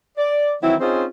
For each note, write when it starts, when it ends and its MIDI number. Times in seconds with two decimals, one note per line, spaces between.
0.18 0.53 74
0.62 0.75 51
0.62 0.75 52
0.62 0.75 54
0.62 0.75 60
0.62 0.75 64
0.80 1.04 60
0.80 1.04 61
0.80 1.04 63
0.80 1.04 65
0.80 1.04 68
0.80 1.04 72